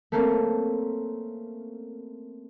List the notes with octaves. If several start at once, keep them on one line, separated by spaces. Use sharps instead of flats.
A3 A#3 C4 C#4